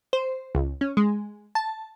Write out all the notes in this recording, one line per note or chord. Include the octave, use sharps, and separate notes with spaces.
C5
C#2
C#4
G#3
A5